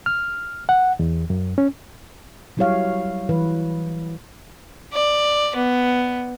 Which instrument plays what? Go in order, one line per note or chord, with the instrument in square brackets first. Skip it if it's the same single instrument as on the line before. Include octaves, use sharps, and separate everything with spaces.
[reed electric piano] F6
F#5
E2
F#2
C#4
[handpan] F#3 G3 E4 G4 C#5 F5
E3 B4
[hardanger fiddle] D5
B3